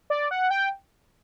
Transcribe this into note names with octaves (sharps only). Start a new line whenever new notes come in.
D5
F#5
G5